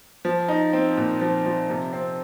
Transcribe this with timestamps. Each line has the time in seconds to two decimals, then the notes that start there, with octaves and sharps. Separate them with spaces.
0.25 F3
0.48 D#4
0.73 C4
0.97 A#2
1.21 F3
1.46 F3
1.70 C3
1.93 C4